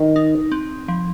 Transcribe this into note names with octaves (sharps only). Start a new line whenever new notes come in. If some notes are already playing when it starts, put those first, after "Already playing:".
Already playing: D#3
D#4
C4
F3